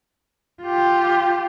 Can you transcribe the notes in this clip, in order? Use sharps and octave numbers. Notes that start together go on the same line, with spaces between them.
F4 G4